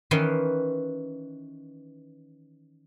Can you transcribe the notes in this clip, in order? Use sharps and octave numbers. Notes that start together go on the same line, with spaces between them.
D#3 E3 C#4 B4 C6